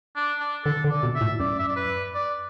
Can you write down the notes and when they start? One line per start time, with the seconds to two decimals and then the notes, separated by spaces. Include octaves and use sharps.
0.16 D4
0.40 D4
0.65 D3 A4
0.84 D3
0.90 D5
1.03 B2
1.15 E5
1.21 A2
1.40 F#2 D5
1.59 E5
1.69 D5
1.76 B4
2.15 D5